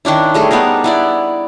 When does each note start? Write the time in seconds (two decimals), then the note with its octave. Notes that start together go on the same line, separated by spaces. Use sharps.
0.05 D#3 C#4 D4 E4
0.34 G3 A3 G#4
0.51 B3 D4 D#4 A#4
0.84 B3 E4 D5